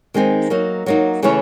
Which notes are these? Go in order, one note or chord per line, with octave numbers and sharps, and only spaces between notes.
D#3 G#3 C4 D#4
F#3 A#3 D#4
F#3 A#3 D#4
C#3 E3 A3 C#4 E4